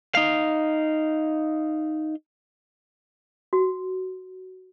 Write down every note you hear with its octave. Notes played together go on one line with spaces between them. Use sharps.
D#4 F5
F#4